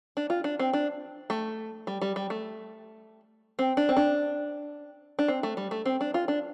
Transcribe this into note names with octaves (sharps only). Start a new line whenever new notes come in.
D4
F4
D4
C4
D4
A3
G3
G3
G3
A3
C4
D4
C4
D4
D4
C4
A3
G3
A3
C4
D4
F4
D4